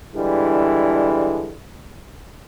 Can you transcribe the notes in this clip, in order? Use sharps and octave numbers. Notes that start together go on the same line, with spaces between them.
D3 E3 G3 G#3 D4 E4